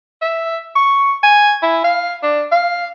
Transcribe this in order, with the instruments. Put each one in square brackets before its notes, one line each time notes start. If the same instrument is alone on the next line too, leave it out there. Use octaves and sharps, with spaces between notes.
[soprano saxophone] E5
C#6
G#5
E4
F5
D4
F5